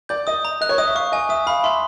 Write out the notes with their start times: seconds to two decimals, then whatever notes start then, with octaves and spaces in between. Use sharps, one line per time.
0.09 D5 G6
0.27 D#5 D#6
0.45 A#5
0.61 D#5 F#6
0.69 C#5
0.78 D#5 D#6
0.87 E5
0.95 F5 C#6
1.12 D#5 G#5
1.29 E5 D#6
1.46 F5 B5
1.64 E5 C6